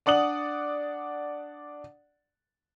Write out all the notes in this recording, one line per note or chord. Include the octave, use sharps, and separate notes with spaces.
D4 D5 F#5 D#6 F#7